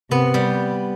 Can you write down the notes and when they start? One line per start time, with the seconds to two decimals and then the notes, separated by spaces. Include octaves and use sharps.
0.10 C3 B3
0.34 G3